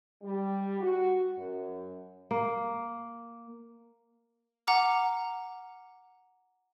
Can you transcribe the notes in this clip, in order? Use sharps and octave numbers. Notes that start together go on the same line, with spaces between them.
G3
F#4
F#2
A#3
F#5 A#5 D6 F6